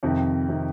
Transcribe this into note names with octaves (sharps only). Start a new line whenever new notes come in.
F2 C3 D#3
C3 D#3